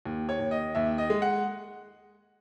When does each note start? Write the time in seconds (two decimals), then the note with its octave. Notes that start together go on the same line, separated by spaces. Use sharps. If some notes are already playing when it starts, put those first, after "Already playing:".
0.06 D#2
0.29 C#5
0.40 D#2
0.51 D#5
0.75 D#2 E5
0.98 D#5
1.10 G#3
1.22 F#5